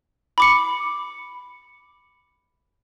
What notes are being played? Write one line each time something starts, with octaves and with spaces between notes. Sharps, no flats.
B5 D6 C#7